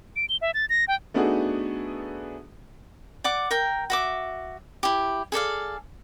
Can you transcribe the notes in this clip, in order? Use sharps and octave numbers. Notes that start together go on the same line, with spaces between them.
D7
G7
E5
A6
A#6
G5
A3 B3 D4 D#4 F#4 G#4
D5 F#5 D6
A#4 G5
F#4 E5 D6
E4 G4
G#4 A4 D5 F5